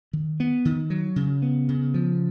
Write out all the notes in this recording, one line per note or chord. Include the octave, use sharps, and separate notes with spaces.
D#3
B3
D#3
F#3
C#3
B3
C#3
F3